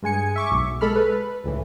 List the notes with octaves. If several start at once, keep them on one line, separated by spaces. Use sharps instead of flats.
G2 G#3 G#5 C#7
E5 C#6 D6
B1
G#3 A4 B5 F6
B4
C#2 A2 E3